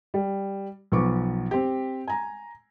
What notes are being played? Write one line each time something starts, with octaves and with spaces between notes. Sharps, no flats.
G3
B1 F3 B3 C#6 D6
C4 G4
G#5 A#5